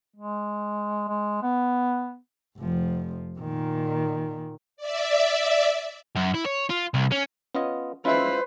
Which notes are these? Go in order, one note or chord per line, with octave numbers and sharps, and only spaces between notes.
G#3
G#3
B3
F1 F3
A#2 D#3
D5 E5
F#2
E4
C#5
F4
C2
C#4
B3 C#4 F4 D#5
G#3 C#4 E4 F4 B4 C5 E5